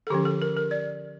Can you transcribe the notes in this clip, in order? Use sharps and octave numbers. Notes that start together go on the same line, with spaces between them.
A4
D3 F3 C#4 G4
A4
A#4
A#4
D5